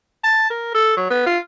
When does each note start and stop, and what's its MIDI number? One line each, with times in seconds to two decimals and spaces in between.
0.24 0.50 81
0.50 0.72 70
0.75 0.96 69
0.97 1.09 54
1.10 1.24 59
1.26 1.38 65